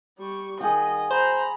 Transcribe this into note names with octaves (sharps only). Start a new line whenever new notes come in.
G3 C#6
D#3 G#4 D#5 F#5 G5
C5 A#5 B5